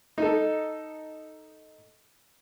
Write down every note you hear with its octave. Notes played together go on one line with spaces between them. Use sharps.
D#4 A4